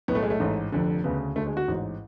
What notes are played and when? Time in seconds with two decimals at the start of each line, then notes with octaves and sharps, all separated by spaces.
0.08 B1 A2 B3
0.15 A3
0.23 G#3
0.30 A3
0.40 A1 G#2
0.72 F1 F2 D3
1.04 D2 C#3 B3
1.36 D2 D3 A3
1.47 G#3
1.57 F#4
1.68 A1 G#2